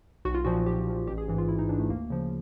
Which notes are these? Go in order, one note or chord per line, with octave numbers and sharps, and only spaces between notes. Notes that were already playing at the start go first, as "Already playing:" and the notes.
B1 F#4
F4
A#2 F3 F#4
B1 G4
A#2 F3
A1 G4
G#4
G#2 E3
F4
A1 E4
D#4
G#2 E3 D4
A3
D2 A#3
C#3 F3